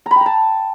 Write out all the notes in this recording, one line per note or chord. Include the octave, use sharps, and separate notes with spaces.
A#5
B5
G5
A#5
A5